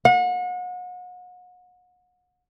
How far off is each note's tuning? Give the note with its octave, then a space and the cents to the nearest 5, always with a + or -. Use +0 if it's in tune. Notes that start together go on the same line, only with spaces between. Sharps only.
F#5 -35